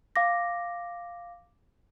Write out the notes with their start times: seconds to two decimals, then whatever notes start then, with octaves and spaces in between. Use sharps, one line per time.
0.16 F5 D6 A#6